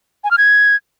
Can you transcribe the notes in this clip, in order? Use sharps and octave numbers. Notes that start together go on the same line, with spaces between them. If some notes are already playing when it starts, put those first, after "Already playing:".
G#5
F6
G#6